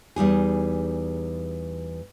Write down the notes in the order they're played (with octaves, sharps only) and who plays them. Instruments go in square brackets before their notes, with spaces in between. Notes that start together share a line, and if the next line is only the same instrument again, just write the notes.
[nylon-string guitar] E2 G3 D#4 G#4